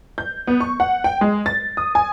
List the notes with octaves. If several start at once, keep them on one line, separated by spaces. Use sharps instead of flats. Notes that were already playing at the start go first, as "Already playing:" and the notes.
G6
B3
C#6
F#5
G5
G#3
A6
D#6
G#5